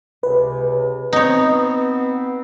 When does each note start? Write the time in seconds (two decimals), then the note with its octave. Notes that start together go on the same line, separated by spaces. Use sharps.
0.23 C#2 C3 B4
1.13 B3 C4 D#4 C#5